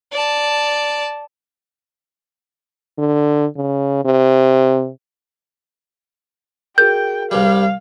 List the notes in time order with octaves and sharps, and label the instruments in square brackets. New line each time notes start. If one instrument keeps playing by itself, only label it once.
[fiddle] D5 A5
[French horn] D3
C#3
C3
[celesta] F#4 G#4 A#4 [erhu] G5 [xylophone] G6
[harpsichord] C2 G2 G3 [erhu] F5